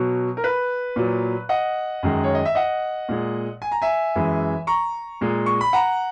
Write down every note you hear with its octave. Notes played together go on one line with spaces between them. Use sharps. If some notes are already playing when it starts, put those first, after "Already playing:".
Already playing: B2 F#3
A#4
B4
A#2 F#3
D#5 F#5
F#2 D#3 G#3
C#5
D#5
E5
D#5 F#5
A#2 G#3
G#5
A#5
E5 G#5
F#2 E3 G#3
A#5 C#6
A#2 G#3
C#6
B5
F#5 A#5